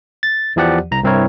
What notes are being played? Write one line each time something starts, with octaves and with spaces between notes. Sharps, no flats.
A6
E2 E3 F3 G4 D5 F#5
C2 A#5
C2 G2 C4 E4 A#4 C#5